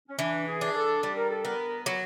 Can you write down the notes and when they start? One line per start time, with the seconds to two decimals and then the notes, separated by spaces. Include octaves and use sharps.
0.08 C#4
0.18 E3 D4
0.47 G#4
0.61 D4
0.75 A4
1.03 G3
1.16 A#4
1.30 A4
1.44 B3 A#4
1.86 F#3